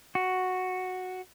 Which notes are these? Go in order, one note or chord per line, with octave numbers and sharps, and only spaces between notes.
F#4